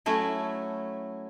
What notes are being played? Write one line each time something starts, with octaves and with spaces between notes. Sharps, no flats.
F#3 A3 C#4 E4